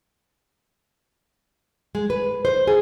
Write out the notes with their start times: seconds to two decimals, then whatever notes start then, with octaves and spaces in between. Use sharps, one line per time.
1.95 G#3
2.10 B4
2.45 C5
2.67 G#4